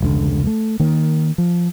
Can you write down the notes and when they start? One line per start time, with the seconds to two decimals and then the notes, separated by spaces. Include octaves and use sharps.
0.01 F1 C#2 D3
0.47 A3
0.80 D#3 A#3
1.38 F3